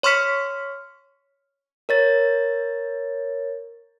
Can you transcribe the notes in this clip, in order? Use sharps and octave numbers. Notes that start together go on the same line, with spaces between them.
C#5 C6 C#6 F6 B6 C#7
A#4 C#5 A6